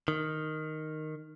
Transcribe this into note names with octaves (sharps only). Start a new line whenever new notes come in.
D#3